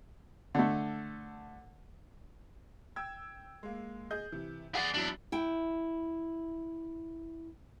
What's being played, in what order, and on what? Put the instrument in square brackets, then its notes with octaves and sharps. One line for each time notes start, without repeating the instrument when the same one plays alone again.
[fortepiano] D3 A3
[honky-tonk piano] G5 E6 G#6
G#3 A#3
G#4 D#5 G6
C3 E3
[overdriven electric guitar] G#4 D5 [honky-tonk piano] F#5 B6 C7
[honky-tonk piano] E2 F#3 [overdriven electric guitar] D4 E4
[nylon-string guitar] E4 G5